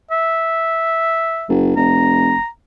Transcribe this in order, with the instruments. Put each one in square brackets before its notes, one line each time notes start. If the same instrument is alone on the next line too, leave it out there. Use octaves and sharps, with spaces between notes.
[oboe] E5
[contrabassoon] F#1
[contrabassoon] F1 [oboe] A#5